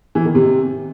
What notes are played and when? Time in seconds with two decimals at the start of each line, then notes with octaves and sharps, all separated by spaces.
0.15 E3
0.25 D#3
0.35 C3